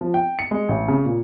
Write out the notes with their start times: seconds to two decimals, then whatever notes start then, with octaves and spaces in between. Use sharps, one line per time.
0.01 F3
0.14 G5
0.39 C#7
0.51 G#3
0.69 A1
0.88 C#3
1.05 A#2